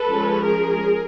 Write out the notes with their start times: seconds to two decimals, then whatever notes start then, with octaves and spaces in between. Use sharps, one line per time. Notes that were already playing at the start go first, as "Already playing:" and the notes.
Already playing: A4 B4
0.08 F3 G#3 C#4
0.44 G#4 A#4